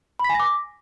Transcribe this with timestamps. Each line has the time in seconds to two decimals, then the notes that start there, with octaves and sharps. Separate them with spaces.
0.19 B5
0.24 B6
0.30 G#5
0.35 A#6
0.40 D6